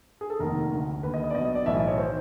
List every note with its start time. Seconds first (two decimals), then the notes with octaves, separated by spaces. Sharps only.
0.21 G#4
0.30 A4
0.40 F1 D#2 D#3 A#4
0.72 D2 D3
1.03 D#2 D3 B4
1.14 D#5
1.24 D#5
1.30 D5
1.34 B2 D#5
1.38 B1
1.45 D#5
1.55 D5
1.66 B1 A2 E3 E5
1.77 D#5
1.88 C#5
1.98 D#3 C5